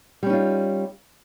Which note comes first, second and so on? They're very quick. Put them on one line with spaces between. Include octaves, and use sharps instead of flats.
G3 C#4 D#4 F4